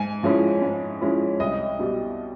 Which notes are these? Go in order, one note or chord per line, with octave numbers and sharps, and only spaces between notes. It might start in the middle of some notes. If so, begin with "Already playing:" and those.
Already playing: G#2 G#5
F3 G#3 C#4 E4
G#2
F3 G#3 C#4 E4
C2 D#5
B2 G3